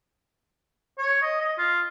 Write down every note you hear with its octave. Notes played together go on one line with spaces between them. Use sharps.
C#5
D#5
D#5
F4